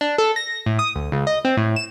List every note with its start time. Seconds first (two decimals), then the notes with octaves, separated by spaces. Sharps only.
0.01 D4
0.18 A4
0.36 A#6
0.66 A2
0.79 D#6
0.96 D2
1.12 C#2
1.27 D#5
1.45 C4
1.57 A2
1.76 E7